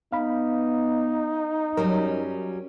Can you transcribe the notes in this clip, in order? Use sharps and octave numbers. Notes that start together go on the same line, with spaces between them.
B3 D#4 F5 B5
F#2 F#3 G3 C#4 A#4